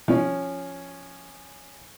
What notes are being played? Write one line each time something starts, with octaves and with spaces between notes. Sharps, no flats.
F3 C#4